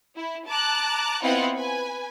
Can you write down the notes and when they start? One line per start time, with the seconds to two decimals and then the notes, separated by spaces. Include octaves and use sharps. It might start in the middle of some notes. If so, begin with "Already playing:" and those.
0.16 E4
0.47 A5 A#5 D6 F#6
1.23 B3 C4 E4 F4 D#5 F#5
1.55 B4 G#5